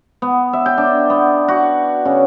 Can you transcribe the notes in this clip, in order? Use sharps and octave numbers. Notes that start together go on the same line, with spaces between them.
B3
E5
G5
D4
B3
F#4
C#3